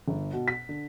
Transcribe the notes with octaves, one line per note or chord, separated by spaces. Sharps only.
G1
B2
B6
D3